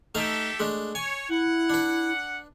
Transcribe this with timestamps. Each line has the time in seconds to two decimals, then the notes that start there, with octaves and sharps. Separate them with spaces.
0.15 A3 D#4 G4 A4 E5 F5
0.59 G#3 A3 D4
0.95 C#5 G#5
1.29 E4 F#5
1.70 D4 B4